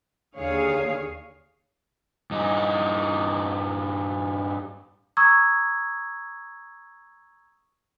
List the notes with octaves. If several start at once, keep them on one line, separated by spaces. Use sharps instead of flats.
D#2 D3 G#4 C#5 F5
G2 D#4
A#5 C#6 D#6 E6 G#6